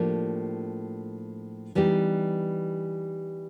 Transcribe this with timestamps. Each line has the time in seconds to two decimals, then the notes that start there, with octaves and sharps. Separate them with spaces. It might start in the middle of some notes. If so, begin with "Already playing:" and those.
Already playing: A2 F3 A#3 D4 G4
1.75 E3 G3 B3 D#4 G4